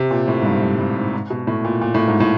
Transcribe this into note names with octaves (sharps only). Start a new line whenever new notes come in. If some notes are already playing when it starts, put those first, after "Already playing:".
Already playing: C3
A#2
A2
G#2
G2
G2
G2
G#2
G#2
B2
A2
A#2
A#2
A2
G#2
A2